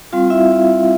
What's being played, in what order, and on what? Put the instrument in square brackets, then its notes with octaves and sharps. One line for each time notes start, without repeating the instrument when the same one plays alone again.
[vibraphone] G3 C4 F4 F5
E4 E5